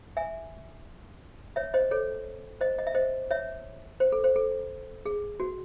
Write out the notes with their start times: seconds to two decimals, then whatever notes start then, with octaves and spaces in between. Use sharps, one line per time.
0.17 E5 G#5
1.56 C#5 E5
1.74 C5 D#5
1.91 A4 C#5
2.61 C5 D#5
2.79 D#5
2.87 E5
2.95 C5 D#5
3.31 C#5 E5
4.00 C5
4.12 A4
4.24 C5
4.36 A4
5.06 G#4
5.40 F#4